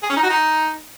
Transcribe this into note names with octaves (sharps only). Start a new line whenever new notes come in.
G#4
C#4
D#4
F#4
D#4